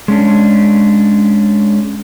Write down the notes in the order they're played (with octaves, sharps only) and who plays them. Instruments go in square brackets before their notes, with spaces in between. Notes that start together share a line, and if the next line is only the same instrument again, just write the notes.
[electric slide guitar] G#3 C#4 D4